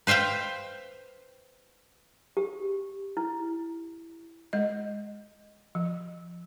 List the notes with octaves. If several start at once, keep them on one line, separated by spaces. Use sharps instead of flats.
B4 C5 E5 F5 G5
G4
E4
G#3 D#5
F3